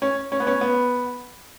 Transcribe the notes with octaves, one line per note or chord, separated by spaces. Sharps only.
C#4
C#4
B3
C#4
B3